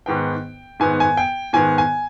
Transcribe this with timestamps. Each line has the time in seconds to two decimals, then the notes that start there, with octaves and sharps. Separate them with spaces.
0.06 G#2 D#3 B3 G5
0.80 G#2 D#3 B3 G#5
1.00 G#5
1.17 G5
1.53 G#2 D#3 B3 G#5
1.78 G#5